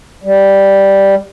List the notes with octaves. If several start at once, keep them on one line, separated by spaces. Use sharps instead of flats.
G3